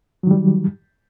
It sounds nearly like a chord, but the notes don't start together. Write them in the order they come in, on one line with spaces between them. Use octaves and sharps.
F#3 D#3 G3